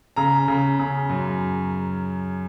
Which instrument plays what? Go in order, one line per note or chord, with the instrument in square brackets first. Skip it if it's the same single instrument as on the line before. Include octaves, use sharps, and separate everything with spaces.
[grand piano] C#3 A#5
C#3
C#3
F#2